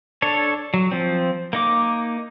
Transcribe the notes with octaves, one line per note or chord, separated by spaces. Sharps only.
D4 A4 C#5
F#3
F3 C4
A#3 D#4 D6